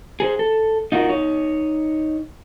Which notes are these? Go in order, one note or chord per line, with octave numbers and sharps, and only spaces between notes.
G#4 A4 C5
A4
D#4 F4 F#4 A4 A#4
D#4 C#5